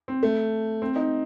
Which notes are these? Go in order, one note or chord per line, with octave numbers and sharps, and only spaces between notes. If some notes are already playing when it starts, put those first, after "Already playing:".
C4
A3
C4
D#4